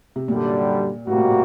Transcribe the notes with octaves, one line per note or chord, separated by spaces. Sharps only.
C3
F#2 A#2 D3 G3
A2 C3 G3 A#3 F#4
A#2
A2